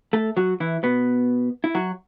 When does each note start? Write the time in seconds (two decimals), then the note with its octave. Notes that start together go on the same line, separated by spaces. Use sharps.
0.13 A3 A4
0.37 F#3 F#4
0.60 E3 E4
0.83 B2 B3
1.64 E4
1.75 F#3 F#4